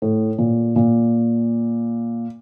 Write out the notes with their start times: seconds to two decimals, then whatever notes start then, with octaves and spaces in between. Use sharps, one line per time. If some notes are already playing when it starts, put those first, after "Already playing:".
0.02 A2
0.38 A#2
0.76 A#2